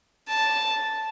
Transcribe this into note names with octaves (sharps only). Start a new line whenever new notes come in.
A5